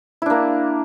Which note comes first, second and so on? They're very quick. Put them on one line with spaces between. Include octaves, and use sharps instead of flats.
E4 D4 A#3